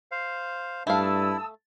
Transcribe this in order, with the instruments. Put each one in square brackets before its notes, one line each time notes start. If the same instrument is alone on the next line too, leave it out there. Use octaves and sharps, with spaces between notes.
[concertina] C5 F5
[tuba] G2 [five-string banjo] A3 F5 [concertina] E4 [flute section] A5 D#6 E6